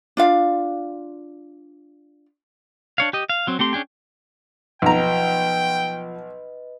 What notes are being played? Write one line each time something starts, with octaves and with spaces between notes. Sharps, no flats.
D4 F4 F5
D4 C#5 F5
G4 D#5
F5
F#3 C4
A3 C4 G4 C6
C#4 D4 G#4 G5
B1 F3 B4 D#5 G5 A#5